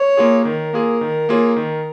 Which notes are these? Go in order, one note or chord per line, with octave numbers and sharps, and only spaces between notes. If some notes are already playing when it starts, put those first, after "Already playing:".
Already playing: C#5
A#3 F4 G#4
D#3 A#4
A#3 F4 G#4
D#3
A#3 F4 G#4 C#5
D#3